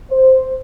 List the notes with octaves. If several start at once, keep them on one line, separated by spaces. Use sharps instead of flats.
C5